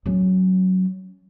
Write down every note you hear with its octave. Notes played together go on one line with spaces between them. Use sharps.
F#3 C#4